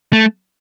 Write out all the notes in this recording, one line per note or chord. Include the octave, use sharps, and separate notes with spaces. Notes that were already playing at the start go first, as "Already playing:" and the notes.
A3